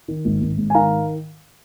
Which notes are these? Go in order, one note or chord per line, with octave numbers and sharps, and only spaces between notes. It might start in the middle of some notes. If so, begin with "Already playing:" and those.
D#3
G#1
G#1
G#2
G#5
D#3 F5 A#5